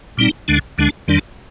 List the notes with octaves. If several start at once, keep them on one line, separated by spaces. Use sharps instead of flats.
A#2 G3 C4 D#4
D2 D3 G#3 D4
D2 D3 G#3 D4
F2 D#3 G3 D4